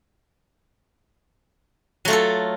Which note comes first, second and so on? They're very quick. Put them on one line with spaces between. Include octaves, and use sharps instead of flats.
F#3 A3 F4 A4